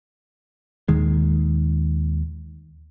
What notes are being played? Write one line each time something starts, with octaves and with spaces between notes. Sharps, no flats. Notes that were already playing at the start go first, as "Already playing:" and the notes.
D#2 A#2 D#3 G#3